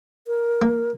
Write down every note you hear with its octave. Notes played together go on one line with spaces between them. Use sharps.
A#4
A#3